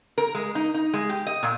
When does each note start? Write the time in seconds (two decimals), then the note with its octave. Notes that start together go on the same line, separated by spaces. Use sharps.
0.18 A#4
0.35 G#3
0.55 D#4
0.74 D#4
0.94 G#3
1.10 G4
1.27 D#5
1.43 A#2